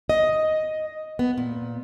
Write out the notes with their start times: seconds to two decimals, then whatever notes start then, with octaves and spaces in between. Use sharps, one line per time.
0.09 D#5
1.19 B3
1.38 A#2